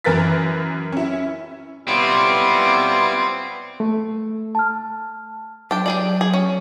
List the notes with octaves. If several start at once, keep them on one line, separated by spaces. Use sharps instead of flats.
F#2 E3 A#4 B4 A6 B6
C#4 E4
G3 B3 C4 E4 F4 B4 C#5
A3
A5 F6
F#3 D4 G5
G4 G#4 D5
G#4
C#4